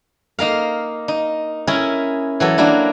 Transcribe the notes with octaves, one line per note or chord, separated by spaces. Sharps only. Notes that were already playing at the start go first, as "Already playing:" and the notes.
A#3 D#4 A#4 F5
D#4
C#4 E4 G#4 A#4
E3 F#3 A4
F#3 A#3 D4 E4